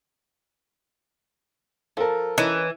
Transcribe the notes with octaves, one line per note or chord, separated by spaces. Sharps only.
F3 A4 A#4
E3 C#4 D#4 B4